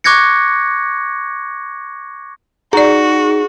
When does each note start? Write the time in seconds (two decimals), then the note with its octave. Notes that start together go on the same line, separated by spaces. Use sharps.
0.04 C#6 D6 F#6 G#6 A#6 C#7
2.73 D#4 F#4 G#4 D5 A#5